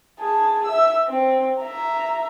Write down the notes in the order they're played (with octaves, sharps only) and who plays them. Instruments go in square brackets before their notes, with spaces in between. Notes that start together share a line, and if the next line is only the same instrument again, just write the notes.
[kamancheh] G#4 A5
E5 E6
C4
E5 A#5